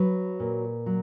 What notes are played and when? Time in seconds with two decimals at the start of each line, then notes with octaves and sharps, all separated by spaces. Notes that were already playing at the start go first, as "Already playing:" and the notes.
Already playing: F#3 B4
0.40 A#2
0.86 F#3